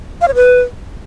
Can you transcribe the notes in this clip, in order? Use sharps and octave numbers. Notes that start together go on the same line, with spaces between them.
F5
C#5
B4